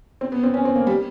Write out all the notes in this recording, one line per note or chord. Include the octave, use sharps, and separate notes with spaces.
C4
B3
C4
C#4
C4
A#3
G3